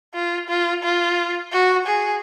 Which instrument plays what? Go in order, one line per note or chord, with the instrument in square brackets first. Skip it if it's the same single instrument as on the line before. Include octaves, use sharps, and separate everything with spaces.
[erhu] F4
F4
F4
F#4
G#4